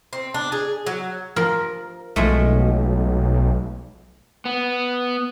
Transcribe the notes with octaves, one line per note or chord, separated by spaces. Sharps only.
C4
D4
G#4
F#3
F3 A#4
B1 F3 G#3 A3
B3